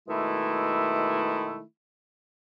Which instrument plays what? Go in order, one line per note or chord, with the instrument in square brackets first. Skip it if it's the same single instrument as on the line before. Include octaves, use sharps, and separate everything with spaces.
[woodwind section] B2 D#3 G#3 A3 E4